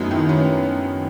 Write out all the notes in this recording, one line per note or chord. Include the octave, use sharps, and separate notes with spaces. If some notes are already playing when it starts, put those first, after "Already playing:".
Already playing: F#2 F#3 A3 B3 D#4
D#3 E4
B3 C#4